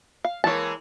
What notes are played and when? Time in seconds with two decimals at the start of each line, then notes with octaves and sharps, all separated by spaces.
0.25 F5
0.44 E3 G#3 A#3 C#5 A5